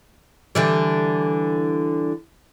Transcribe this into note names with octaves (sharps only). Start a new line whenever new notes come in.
D3 E3 G3